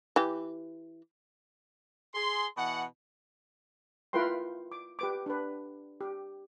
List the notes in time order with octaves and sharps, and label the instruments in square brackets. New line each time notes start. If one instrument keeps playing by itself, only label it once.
[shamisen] E3 G4
[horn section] G#4 C6
B2 E3 F#5
[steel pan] E4 F4 A#4 B4 G5 C6
D6
G4 B4 D6
D4 B4
G4